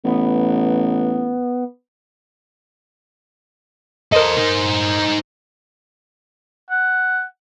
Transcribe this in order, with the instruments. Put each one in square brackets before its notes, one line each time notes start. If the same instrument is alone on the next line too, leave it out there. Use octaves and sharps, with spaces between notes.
[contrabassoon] A1 [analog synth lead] B3
[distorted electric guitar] A4 C5 [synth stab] A#4 D#5
[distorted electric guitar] D#4 C5
[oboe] F#5